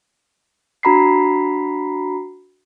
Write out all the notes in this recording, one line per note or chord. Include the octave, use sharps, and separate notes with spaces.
D4 F#4 A#5 B5 B6 C7